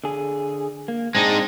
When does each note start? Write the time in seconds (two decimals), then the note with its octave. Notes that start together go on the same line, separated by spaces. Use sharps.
0.04 D3 G#4
0.88 A#3
1.15 G#3 C4 D4 D#4